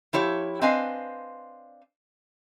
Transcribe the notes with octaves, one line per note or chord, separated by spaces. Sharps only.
F3 E4 G4 C#5
C4 D4 B4 D#5 F5 G#5